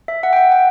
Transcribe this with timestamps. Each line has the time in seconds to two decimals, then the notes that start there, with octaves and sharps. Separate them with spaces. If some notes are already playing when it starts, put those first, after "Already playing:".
0.08 E5
0.23 F#5
0.33 G5
0.37 F#5
0.52 G5